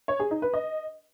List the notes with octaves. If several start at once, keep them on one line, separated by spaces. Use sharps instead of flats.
C#5
G#4
D#4
B4
D#5